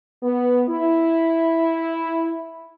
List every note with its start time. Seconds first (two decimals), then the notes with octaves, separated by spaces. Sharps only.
0.22 B3
0.68 E4